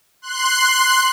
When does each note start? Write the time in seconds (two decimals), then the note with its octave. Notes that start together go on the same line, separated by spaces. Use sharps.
0.22 C6 F#6